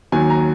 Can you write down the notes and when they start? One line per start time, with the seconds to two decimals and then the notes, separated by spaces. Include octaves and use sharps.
0.12 D#2 D#3 F#3 G#5
0.30 A#5